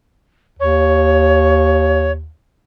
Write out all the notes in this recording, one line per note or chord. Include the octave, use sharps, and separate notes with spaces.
D#2 C#5